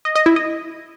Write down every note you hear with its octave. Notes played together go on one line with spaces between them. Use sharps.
D#5
D#5
E4
D#5